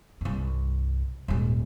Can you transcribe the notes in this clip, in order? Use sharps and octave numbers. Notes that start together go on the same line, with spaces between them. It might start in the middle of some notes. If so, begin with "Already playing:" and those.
C2 G2
D#1 G#2